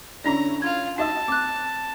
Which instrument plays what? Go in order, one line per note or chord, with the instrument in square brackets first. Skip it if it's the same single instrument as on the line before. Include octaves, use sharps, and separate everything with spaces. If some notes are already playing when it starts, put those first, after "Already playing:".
[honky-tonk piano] D3 E4 C#5 [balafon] C#4 D4 D5 [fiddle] A#5
[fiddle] F4 F5 [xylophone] G#6
[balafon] D#4 [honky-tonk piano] F#4 D#5 E6 [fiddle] A5
[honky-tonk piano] C4 [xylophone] D6 F#6